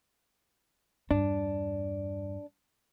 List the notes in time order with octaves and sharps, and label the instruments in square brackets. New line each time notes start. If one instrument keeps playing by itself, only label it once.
[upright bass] E2 G2 [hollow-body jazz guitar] D4